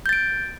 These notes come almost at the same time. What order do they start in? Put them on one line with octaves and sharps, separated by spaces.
G6 A6 D7